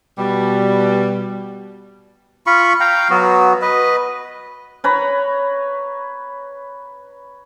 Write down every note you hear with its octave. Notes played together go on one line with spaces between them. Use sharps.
B2 G3
F4 B5 C#6
F5 G5 A#5
F#3 B3 F#4
B4 D#5
B4 C#5 A#5 B5